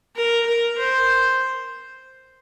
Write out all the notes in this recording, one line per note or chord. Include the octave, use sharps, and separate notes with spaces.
A#4
A#4
C5